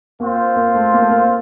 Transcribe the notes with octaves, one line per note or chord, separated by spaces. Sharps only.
A#3 C4 F4 C5
A#3
A3
A#3
A3
A#3